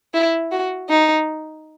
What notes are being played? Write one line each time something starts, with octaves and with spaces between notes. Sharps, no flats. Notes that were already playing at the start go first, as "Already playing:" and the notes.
E4
F#4
D#4